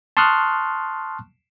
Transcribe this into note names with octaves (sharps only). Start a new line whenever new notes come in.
A5 C6 C#6 D#6 F6 F#6